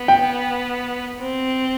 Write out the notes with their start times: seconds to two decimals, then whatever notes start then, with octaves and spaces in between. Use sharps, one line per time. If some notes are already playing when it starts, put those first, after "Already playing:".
Already playing: B3
0.08 G5
1.21 C4